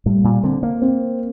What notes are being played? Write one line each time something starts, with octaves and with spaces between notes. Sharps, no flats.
A2 G3
A#2
D3 C4
A#3
C4